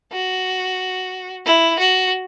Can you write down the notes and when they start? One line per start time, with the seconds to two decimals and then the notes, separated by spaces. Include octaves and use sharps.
0.12 F#4
1.46 E4
1.79 F#4